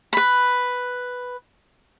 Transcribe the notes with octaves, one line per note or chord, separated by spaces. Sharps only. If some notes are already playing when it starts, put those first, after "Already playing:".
B4 B5